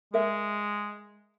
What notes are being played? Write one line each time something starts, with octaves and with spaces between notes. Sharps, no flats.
G#3 A#4 E5